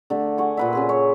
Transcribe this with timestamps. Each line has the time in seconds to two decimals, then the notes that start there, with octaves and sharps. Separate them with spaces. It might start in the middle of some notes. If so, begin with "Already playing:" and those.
0.10 D3 A3
0.38 G#4 F#5 C#6
0.57 A#2 B4 E5
0.73 C#3 G#4 C6
0.89 C#5